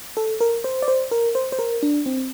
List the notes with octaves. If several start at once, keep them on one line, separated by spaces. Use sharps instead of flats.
A4
A#4
C5
D5
C5
A#4
C5
C5
A#4
D4
C4